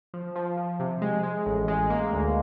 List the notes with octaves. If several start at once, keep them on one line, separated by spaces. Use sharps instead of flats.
F3
F3
F3
C3
G#3
G#3
A1
G#3
A#3
D2